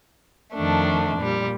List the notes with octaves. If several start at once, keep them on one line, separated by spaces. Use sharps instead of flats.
F2 D#3 A3 D4
A#2 G3